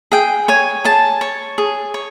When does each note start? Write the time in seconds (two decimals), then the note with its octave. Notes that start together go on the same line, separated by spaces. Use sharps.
0.12 G#4 G5
0.48 C#5 G#5
0.84 G#4 A5
1.21 C#5
1.58 G#4
1.94 C#5